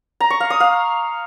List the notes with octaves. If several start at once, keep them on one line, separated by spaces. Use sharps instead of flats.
A#5
C#6
F5
D#6
F5